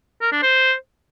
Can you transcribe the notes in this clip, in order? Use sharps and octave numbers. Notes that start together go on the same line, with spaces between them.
A#4
D4
C5